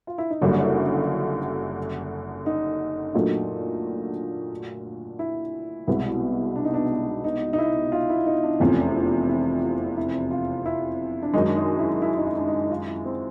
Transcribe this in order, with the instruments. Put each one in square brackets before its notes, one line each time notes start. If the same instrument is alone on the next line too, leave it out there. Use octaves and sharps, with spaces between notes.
[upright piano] F4
E4
D#4
[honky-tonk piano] F#1 F#2 D3 G3 [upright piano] D4
[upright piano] E4
E4
F4
D#4
[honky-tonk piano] A#2 F#3 A3 D4 F4
[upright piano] E4
[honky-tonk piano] C2 B2 G#3 B3 [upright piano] E4
[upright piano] D4
D#4
D4
D#4
D#4
E4
F4
E4
D#4
D4
[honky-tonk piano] F1 E2 C3 F3 [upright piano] C#4
[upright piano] C#4
D4
E4
F4
E4
F4
E4
D4
[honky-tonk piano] F#2 D#3 G#3 [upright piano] D#4
[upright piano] D4
D#4
E4
E4
D#4
E4
D4
D#4
E4
F4
E4
C4